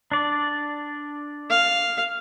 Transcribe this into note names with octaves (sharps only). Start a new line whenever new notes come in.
D4 D5
F5